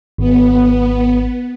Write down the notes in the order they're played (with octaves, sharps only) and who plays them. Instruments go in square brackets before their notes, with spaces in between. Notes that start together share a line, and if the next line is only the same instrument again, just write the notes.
[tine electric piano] G#1 [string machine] B3